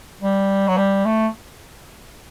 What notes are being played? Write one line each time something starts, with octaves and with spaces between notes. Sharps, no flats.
G3
F#3
G3
A3